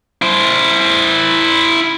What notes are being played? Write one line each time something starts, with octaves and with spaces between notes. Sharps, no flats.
E4 C5